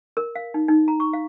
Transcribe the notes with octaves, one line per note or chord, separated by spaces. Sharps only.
A#4
F5
D#4
D#4
A#5
C#6
F5